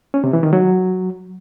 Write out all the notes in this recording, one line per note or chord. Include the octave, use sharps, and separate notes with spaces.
C#4
C3
E3
D#3
F#3